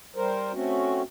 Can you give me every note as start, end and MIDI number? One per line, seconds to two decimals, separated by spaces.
0.16 0.52 55
0.16 0.52 70
0.16 0.52 72
0.53 1.02 57
0.53 1.02 60
0.53 1.02 61
0.53 1.02 66